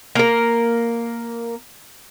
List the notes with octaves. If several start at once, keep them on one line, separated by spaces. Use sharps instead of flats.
A#3 A#4